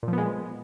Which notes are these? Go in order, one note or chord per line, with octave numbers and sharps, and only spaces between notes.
A#2
F3
B3
G#3